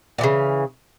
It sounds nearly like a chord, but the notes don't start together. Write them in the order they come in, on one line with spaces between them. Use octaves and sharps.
A#2 E3 C#3